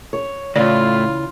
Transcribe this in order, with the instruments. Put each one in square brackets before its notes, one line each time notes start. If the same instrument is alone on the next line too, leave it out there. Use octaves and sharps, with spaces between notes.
[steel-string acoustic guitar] C#5
[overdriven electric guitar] A2 [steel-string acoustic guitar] C#3 E3 [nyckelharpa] F4 [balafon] D5